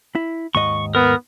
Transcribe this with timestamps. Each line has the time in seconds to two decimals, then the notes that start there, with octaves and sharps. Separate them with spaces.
0.15 E4
0.55 D#2 G#2 D#5 C#6
0.95 B3 A#4